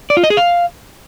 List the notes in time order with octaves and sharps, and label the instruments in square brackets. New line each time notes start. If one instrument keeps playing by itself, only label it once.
[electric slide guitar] D5
F4
D#5
G#4
F5